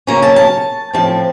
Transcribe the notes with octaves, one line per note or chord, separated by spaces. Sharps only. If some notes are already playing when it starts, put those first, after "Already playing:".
C#3 F#3 A#3 C#4 A#5
A5
A5
A2 F3 C4 A5